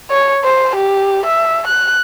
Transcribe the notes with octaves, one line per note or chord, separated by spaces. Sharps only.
C#5
C5
G4
E5
F#6